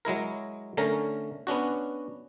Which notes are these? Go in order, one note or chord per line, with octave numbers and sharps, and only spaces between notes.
F#3 G#3 E4 A#4
D3 A3 C#4 A#4
B3 C#4 D4 F#4